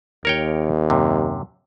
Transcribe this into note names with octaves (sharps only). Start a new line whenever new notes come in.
D#2 A#4 C#5 G5
F#2 C3